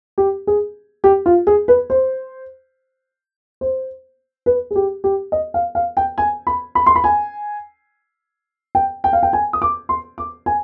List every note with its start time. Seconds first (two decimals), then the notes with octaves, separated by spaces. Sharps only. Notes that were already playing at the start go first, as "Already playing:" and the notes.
0.18 G4
0.47 G#4
1.04 G4
1.26 F4
1.47 G#4
1.68 B4
1.90 C5
3.61 C5
4.46 B4
4.71 G#4
4.76 G4
5.04 G4
5.32 D#5
5.54 F5
5.75 F5
5.97 G5
6.18 G#5
6.47 B5
6.75 B5
6.86 C6
6.96 B5
7.04 G#5
8.75 G5
9.04 G5
9.13 F5
9.23 G5
9.33 G#5
9.53 D#6
9.62 D6
9.89 C6
10.18 D6
10.46 G#5